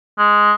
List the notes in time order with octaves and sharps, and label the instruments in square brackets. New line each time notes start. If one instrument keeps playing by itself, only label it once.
[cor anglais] G#3